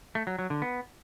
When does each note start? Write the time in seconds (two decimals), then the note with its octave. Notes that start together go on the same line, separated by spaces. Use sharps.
0.15 A3
0.27 F#3
0.39 F#3
0.50 D3
0.62 B3